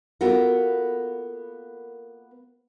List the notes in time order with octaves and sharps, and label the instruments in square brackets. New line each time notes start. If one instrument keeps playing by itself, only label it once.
[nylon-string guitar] A#3 B3 F4 F#4 A4 A#4